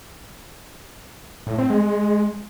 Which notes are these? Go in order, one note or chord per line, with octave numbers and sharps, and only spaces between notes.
A2
C4
G#3